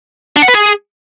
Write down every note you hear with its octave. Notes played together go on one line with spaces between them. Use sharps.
D4
F#5
B4
G#4